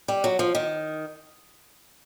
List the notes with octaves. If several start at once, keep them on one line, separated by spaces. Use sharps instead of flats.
G3
F#3
F3
D#3